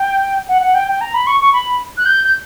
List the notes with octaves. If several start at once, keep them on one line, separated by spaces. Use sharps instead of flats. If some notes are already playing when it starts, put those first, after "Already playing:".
Already playing: G5
F#5
F#5
G5
G5
A#5
B5
C#6
C#6
B5
F#6
G6
G6